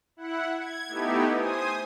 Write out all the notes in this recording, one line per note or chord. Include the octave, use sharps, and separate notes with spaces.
E4 F#5
G#6
A3 B3 D#4 E4 G4
C5 G#5 D#6